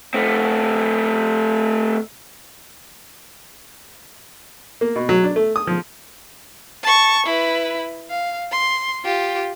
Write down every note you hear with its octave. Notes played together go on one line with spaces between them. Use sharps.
A3 C4
A#3
B2
F#3
D4
A3
D#6
F3
A5 C#6
E4 B4
F5
C6
F4 G4